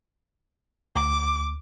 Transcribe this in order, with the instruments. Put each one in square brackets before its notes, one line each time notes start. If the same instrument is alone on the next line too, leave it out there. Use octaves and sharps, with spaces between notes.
[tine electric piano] D2 [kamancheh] D6